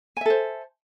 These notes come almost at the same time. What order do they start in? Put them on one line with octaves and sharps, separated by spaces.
G#5 E5 A4 C5